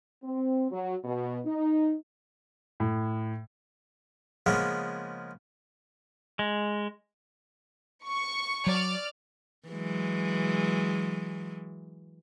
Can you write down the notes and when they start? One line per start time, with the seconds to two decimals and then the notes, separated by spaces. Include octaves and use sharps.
0.24 C4
0.71 F#3
1.04 B2
1.45 D#4
2.80 A2
4.46 C#3 F3 G#3 A#3 B3
6.39 G#3
8.06 C#6
8.67 F#3 D5 F6
9.68 E3 F#3 G#3